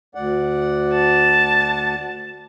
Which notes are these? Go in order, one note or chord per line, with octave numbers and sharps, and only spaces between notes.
D2 D5 F#5
A5